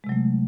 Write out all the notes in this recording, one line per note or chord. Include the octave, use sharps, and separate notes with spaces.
C3 F#3 G#3 A3